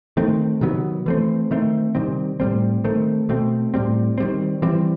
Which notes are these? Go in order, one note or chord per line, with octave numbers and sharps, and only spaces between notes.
D#3 A3 C4
C3 D#3 F#3 B3
E3 A3 C4
D#3 A3 C4
C3 D#3 G3 C4
A2 G3 C4
D#3 A3 C4
B2 A3 C4
A2 G3 C4
D#3 G3 C4
E3 G3 C4